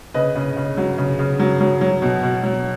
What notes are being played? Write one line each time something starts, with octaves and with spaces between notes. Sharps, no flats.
C#3 B4 D#5
C#3
C#3
F#3
C#3
C#3
F#3
F#3
F#3
B2
B2
F#3